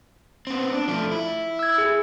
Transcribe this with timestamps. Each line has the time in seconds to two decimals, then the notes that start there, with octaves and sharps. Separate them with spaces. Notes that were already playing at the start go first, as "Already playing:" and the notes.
0.47 B3 C4
0.73 D4
0.88 F3 A3
1.11 E4
1.59 E6 G#6
1.78 G#4